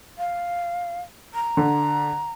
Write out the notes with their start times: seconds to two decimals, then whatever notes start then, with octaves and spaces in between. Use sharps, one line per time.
0.18 F5
1.34 A#5
1.57 D3